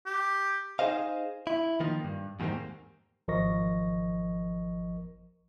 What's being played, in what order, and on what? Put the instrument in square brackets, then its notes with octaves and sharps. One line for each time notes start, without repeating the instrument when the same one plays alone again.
[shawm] G4
[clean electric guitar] D#4 G#4 C5 D#5 F5
E4
D#3 F3 A#3 D#4 F4
G2
E2 G#2 D#3 G3 A#3 C4
[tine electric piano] G#1 F3 A#4 D#5 C#6 A#6